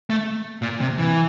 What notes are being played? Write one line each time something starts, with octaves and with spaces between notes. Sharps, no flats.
A3
A#2
C3
E3